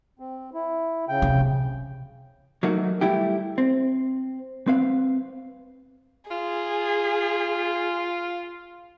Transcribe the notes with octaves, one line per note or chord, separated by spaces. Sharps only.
C4
E4
C#3 G5
C3
F#3 A3 A#3 D#4 F#4
G3 A3 E4 G4
C4
C4 B4 F5
F4 G#4